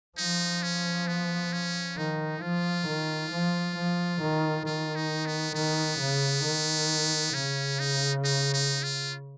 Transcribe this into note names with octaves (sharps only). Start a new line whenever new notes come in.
F3 D#4
C#4
B3
C#4
D#3 D#4
F3 F4
D#3
F3
F3
D#3
D#3 F4
D#4
B3
D#3 B3
C#3
D#3
C#3 C#4
D#4
D#4
D#4
F4